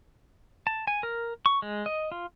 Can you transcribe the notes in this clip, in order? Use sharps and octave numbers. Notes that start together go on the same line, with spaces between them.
A5
G#5
A#4
C#6
G#3
D#5
F4